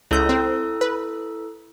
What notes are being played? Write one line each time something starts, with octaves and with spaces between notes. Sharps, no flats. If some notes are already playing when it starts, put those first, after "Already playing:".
C#2 E4 A4 E6 G6
C4
B4